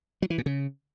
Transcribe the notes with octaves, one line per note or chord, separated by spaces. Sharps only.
F#3
E3
A#2
C#3